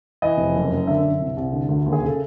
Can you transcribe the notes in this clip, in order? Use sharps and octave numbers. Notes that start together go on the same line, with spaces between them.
E3 D#5
F1
F#1
F#2
D3 E5
F#2
C2
C2
D3
D2
D#2
G#4
C#3 A4